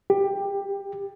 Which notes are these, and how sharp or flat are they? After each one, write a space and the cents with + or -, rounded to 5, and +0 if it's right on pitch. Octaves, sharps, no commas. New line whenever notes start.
G4 +15